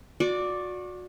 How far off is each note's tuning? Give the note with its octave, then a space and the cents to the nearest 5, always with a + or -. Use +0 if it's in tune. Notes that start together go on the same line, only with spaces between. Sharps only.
F#4 -30 D5 +0